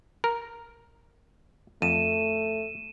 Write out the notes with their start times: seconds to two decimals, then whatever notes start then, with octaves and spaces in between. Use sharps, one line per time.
0.24 A#4
1.82 F2 A3 D#7 E7